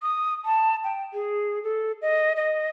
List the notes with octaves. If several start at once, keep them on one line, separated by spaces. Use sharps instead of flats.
D#6
A5
G5
G#4
A4
D#5
D#5